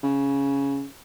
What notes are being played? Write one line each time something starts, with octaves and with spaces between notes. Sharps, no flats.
C#3